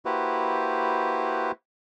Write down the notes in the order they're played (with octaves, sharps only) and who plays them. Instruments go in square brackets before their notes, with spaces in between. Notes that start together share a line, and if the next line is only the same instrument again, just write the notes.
[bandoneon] A#3 E4 F#4 G4 B4 C5